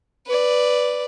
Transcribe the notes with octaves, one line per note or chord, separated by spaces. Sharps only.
B4 D5